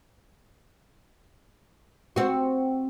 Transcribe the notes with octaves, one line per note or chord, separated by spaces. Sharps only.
C4 F#4